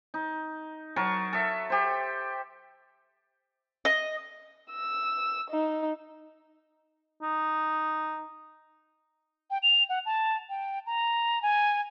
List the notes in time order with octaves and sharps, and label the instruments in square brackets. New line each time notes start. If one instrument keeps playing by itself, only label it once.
[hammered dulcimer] D#4
F#3 A#4 A5 C#6
A4 E5
G4 C5
[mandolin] D#5
[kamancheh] E6
D#4
[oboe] D#4
[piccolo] G5
F7
F#5
A5
G5
A#5
G#5